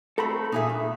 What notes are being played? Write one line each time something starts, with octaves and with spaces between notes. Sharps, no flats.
A3 C4 A4 A#5 B5
A#2 D#4 G#4 E5
G2